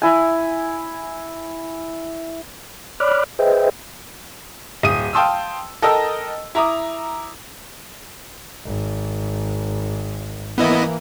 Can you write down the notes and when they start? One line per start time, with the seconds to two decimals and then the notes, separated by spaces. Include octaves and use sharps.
0.02 E4 G#5
3.00 C#5 D5 B5 D6 F6 F#6
3.39 G#4 B4 C5 D#5 E5 G5
4.83 D1 D#6 D#7
5.13 F5 G5 A5 C6 D#6 E6
5.82 A4 A#4 D#5 G5 A5 E6
6.55 E4 A#5 D6 D#6
8.65 G#1
10.58 E3 A#3 B3 E4 D#5